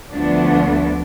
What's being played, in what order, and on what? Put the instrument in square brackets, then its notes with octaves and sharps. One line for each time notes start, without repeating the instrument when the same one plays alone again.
[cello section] D2 F3 A3 B3 D4